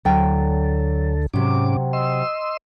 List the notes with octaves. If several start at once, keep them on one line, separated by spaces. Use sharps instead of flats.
D2 D3 F#3 A4 G5
G#2 C3 F#3 C#4 D6
D#5 C6 E6